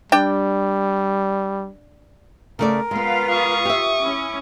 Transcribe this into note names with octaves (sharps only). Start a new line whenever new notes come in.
G3 D4 G5
C#3 A3 A#4 D5
G#3 B3 F4 B4 F5
C#6 D#6
G4 E5
C#4 E4